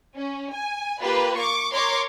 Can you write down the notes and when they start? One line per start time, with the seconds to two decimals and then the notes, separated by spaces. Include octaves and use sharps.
0.17 C#4
0.54 G#5
1.02 A#3 F4 G4 B4
1.38 C#6 D6
1.71 A#4 C#5 C6 D6